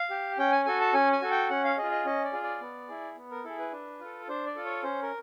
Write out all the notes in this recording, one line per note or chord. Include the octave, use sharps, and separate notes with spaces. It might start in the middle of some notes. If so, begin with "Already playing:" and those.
Already playing: F5
G4
C#4 G5
G#5
F#4 A4 G#5
A5
C#4 G#5
G#5
F#4 A4
G5
C#4 F#5
F5
F4 G#4 D#5
D#5
C#4 D#5
D5
F4 G#4
D5
B3
E4 G#4
B3
A#4
E4 G#4 A4
B4
D4
F4 A4
D4 C5
D5
F4 A4
C#5
C#4 C5
A#4